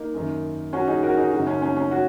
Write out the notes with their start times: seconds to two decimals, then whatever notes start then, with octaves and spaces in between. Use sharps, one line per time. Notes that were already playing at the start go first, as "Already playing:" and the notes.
Already playing: A#3 D#4
0.14 F#2 D#3
0.73 C#4 F#4
0.87 D#4 G#4
1.03 F#4 A#4
1.17 D#4 G#4
1.31 F#2 C#3 F#4
1.39 D#4
1.47 C#4
1.62 C#4
1.76 C#4
1.91 C#4 F#4